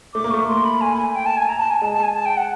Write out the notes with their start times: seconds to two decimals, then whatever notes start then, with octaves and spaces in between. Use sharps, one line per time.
0.14 A3 D6
0.24 A#3
0.31 A3 C#6
0.48 C6
0.65 B5
0.81 G#5
0.97 G#5
1.15 G5
1.26 A5
1.37 G#5
1.49 A#5
1.59 A5
1.71 G#5
1.81 G#3 A5
1.92 A5
2.03 G#5
2.14 A5
2.25 G5
2.37 F#5